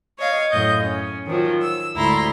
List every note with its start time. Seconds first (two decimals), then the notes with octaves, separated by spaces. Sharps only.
0.19 C#5 D#5 F5
0.51 F#2 A2 D#5 G6
0.84 C#4
1.27 D#3 F3 F#3
1.62 E6
1.95 D2 G#2 E4 A#5 C6